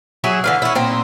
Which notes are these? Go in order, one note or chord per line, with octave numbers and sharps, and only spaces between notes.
F#3 E4 G#4 E5
D3 E3 F5
C#4 E4
A#2 C4 D#4